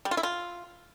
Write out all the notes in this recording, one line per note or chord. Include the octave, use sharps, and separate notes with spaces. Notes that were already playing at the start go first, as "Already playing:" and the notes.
G3
F4
E4
F4